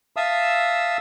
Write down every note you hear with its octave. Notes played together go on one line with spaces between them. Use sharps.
E5 F5 A5 D#6 E6